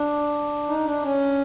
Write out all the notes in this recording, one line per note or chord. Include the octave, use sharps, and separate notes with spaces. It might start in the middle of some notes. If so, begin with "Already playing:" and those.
Already playing: D4
D#4
D4
C#4